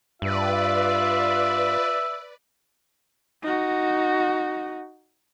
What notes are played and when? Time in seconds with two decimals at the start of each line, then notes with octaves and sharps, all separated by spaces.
0.22 G2 F4 B4 D5 E5
3.43 D#4 F#4